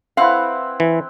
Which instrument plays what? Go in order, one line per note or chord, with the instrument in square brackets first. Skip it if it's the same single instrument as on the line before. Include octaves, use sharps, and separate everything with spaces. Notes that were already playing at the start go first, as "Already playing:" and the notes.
[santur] C4 E4 B4 [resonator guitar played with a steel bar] F5 F#5
[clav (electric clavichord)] E3